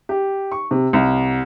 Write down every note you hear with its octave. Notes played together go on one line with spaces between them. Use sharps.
G4
C#6
C3
C2